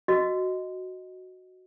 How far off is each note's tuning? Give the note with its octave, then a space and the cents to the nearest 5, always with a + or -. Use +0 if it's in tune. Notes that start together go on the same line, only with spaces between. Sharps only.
F#4 +0 A#4 +45 D#5 +0